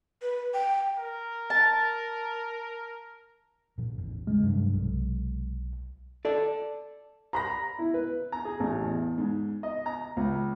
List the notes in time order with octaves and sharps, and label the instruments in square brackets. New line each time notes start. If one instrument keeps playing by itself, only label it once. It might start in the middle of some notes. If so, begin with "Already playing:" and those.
[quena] B4
G5
[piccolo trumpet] A#4
[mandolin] A5
[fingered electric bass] A#2 F3
A1 E2 G#2
[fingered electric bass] C#3 [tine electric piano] G#3
[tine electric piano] G2 [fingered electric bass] C3 F#3 G#3
[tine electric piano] B1
[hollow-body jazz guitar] A4 D5
[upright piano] A#5 B5 A#6
[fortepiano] E4
B4
A#5
G#4
A1
E2
G#2
D#5
A#5
C#2